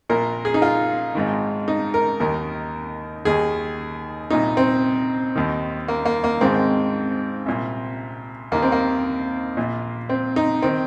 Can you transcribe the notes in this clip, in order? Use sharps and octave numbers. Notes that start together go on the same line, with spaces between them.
A#1 A#2 A#4
G#4
D#4
F4
G#1 G#2 D#3
D#4
A#4
D#2 D#3 A#4
D#2 D#3 G#4
C2 A#2 D#4
C4
D#2 D#3
A#3
A#3
A#3
G#1 G#2 D#3 C4
C2 A#2
D#2 D#3 A#3
C4
A#3
A#1 A#2
C4
D#4
D#3 C4